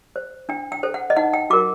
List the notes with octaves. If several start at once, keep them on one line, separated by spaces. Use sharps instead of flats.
C5
D4 G5
G5
A4 C5
F#5
D#5
D#4 F#5
G5
F#4 A#4 D6